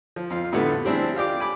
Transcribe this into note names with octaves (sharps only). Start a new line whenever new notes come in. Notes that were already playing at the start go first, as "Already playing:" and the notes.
F3
F2 F4
F2 A2 D3 G3 A3 B3
G3 C4 D4 E4 G#4
F4 G4 D5 D6
G#5 B5 D6